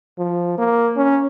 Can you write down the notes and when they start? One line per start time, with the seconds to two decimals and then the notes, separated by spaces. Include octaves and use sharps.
0.18 F3
0.58 A#3
0.97 C#4